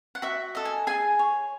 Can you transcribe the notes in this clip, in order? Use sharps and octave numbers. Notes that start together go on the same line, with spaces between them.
F#5
F#4 E5
A4 D#5
G#5
G#4 G#5
C#5